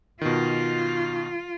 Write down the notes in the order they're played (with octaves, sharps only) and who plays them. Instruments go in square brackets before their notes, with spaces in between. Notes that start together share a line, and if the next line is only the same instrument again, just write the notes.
[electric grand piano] B2 D#3 [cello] F4